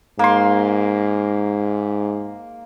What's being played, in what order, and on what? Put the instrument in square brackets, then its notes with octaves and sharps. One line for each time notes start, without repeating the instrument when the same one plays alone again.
[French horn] G#2 [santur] A#3 C6